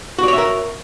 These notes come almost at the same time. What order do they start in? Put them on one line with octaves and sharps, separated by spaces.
F#4 D5 C#5 E5 A#4